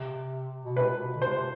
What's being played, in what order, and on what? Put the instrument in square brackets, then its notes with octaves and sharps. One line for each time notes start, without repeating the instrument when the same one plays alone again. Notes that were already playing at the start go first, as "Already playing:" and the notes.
Already playing: [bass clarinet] C3
B2
[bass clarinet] C3 [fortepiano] B4
[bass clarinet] B2
D3
[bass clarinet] C3 [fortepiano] C5
[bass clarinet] C3